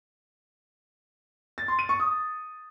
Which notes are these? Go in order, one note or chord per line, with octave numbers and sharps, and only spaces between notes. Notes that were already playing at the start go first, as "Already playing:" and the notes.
A6
C6
D#7
C#6
D#6